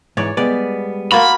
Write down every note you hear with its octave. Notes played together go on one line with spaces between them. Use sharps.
G#2 E3 C#5 D5
G3 G#3 B3 D5
A#3 F4 F#4 B5